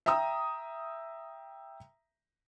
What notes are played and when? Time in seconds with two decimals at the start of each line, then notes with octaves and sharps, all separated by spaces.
0.06 E5 G5 A#5 D#6 E6